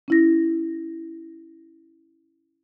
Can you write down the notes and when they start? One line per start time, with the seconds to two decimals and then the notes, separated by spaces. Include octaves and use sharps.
0.08 C#4 E4 A#6